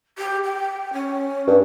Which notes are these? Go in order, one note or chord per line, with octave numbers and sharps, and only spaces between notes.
G4
G5
C#4
G2